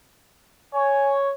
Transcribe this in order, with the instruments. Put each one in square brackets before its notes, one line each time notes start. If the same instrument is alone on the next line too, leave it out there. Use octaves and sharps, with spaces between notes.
[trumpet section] C#5 [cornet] G#5